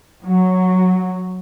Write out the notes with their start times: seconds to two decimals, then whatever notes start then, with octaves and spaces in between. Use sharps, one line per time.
0.24 F#3